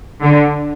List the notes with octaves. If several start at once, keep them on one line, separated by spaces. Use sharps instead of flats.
D3